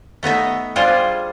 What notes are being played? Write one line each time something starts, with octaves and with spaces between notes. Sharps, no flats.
A3 B3 D#4 E5
G3 D4 F4 G#4 C5